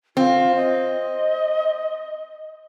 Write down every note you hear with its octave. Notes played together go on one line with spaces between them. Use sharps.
C4 F4
D#5